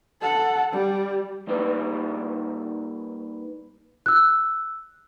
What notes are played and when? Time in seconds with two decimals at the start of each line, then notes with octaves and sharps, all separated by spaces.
0.21 A4 F#5
0.71 G3
1.47 G3 A#3 D#4 G4 B4 D5
4.06 E6 F#6